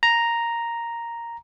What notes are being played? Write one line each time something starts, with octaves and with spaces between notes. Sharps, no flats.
A#5